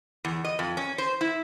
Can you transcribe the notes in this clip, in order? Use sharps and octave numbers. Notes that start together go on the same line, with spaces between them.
E2
D#5
F2
C#4
C5
E4